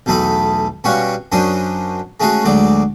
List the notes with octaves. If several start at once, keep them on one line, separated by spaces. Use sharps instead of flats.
B1 E2 A3 D#4 A4 B5
B2 G3 C#4 F#4 F5 C#6
F#2 F#3 C#4 D4 C5 D#6
G#3 A3 C#4 F#4 G#4
D2 F#3 G#3 D5 D6